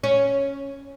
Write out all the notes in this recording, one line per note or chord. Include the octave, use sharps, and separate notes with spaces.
C#4